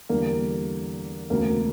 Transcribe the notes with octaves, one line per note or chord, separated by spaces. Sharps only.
E2 D3 G3 A#3
E1 D2 C#3 A#3